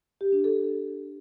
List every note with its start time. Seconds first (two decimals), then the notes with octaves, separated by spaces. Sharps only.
0.21 G4
0.32 D4
0.44 A4